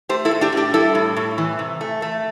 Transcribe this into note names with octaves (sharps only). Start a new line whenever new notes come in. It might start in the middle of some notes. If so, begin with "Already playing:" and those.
A3 G4 C5
E4 A4
A2
D4 G4
A2 D4 G4
G3 E4 A4
A2
A2
E3
C3
A3
A3